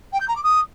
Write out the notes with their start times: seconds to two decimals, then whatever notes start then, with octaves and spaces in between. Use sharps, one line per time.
0.12 G5
0.20 G6
0.28 A#5
0.35 D6
0.43 D#6